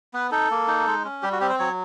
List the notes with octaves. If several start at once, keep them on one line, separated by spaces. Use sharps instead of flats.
B3 B4
D#4 A4
A#3
D#4
G#3
C#4
G3 G4
F#4
C4 G4
C5
F#3 C#5